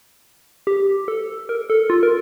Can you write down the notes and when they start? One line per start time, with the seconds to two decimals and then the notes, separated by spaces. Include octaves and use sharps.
0.67 G4
1.08 A4
1.49 A#4
1.70 A4
1.90 F4
2.03 A#4